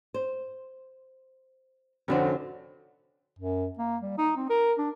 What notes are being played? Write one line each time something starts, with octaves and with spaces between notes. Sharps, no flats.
C5
F1 D3 C#4 F#4 C5
F#2
A#3
G3
D#4
C4
A#4
D4